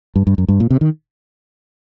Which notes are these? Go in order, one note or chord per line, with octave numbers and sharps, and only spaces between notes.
G2
G2
F#2
G2
A#2
C3
D#3